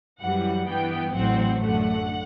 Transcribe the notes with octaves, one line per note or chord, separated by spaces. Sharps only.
F#2 E3 G3 F#5
G2 E3 B3 G5
A1 A2 F#3 C4 F#5
F#2 D3 A3 F#5